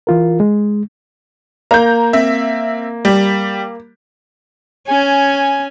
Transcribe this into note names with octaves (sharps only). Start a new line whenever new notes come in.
E3 F4 A#4
G#3
A#3 A#5 G6
C4 E5
G3
C#4 G#5